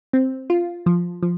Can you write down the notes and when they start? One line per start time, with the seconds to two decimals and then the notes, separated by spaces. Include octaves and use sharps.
0.13 C4
0.50 F4
0.86 F3
1.22 F3